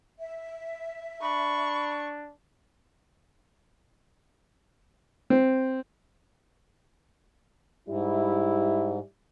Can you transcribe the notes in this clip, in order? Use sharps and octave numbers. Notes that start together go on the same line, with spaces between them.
E5
D4 B5 C#6
C4
G#2 G3 E4